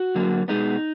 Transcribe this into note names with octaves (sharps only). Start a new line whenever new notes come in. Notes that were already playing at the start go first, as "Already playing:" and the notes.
Already playing: F#4
F#2 D3 F#3 A#3
B2 G#3 B3 D#4